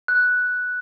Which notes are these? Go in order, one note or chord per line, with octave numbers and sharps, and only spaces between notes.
F#6